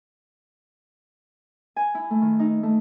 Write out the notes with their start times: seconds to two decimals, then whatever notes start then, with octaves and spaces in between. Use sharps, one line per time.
1.76 G#5
1.95 E4
2.10 A3
2.22 D#3
2.39 D#4
2.63 A3